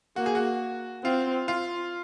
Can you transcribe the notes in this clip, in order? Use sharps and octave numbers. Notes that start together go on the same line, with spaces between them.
A#3 F#4
G#4
F#4
C4 F4
F4